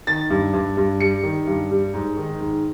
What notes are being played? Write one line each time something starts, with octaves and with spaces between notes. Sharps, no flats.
D#3 A6
G2
G2
G2
G3 C#7
D#3
G2
G3
G#2
D#3
G#2